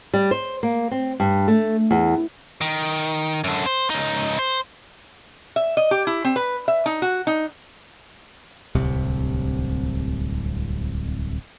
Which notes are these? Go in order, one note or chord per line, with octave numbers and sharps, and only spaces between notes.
G3
C5
A#3
C4
G2
A3
E2
D#3
F#2 D3
C5
C#2 D#4
C5
E5
D#5
G4
E4
C4
B4
E5
D#4
F#4
D#4
D1 C2 C3